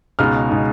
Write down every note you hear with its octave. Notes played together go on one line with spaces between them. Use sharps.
C#2 B2 G#3 D#4 F6
B2 G#3 D#4